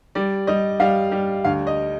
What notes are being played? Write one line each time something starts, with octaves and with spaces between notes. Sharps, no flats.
G3 D5
G3 D#5
G3 F5
G3
D2 F5
D#5